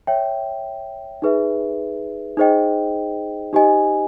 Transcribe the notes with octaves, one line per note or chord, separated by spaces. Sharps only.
C#5 E5 G5
D#4 G#4 B4 E5
D#4 G#4 C5 D#5 G5
D#4 G4 C5 D#5 G#5